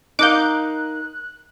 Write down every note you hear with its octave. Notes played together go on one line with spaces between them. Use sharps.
D#4 A#4 F5 D6 F#6 G6